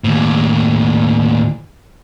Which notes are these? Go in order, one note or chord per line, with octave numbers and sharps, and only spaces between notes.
D#2 A2